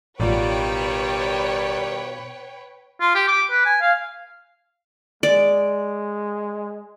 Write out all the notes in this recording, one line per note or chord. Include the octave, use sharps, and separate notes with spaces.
A1 B2 D#3 G3 F4 B4 C#5 G5
F4
G4
D6
B4
G#5
F5
G#3 D5